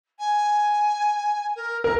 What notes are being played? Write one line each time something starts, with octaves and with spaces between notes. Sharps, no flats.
G#5
A#4
A#4 A#5